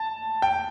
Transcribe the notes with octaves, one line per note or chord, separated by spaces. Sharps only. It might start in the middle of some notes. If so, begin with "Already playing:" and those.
Already playing: A5
G5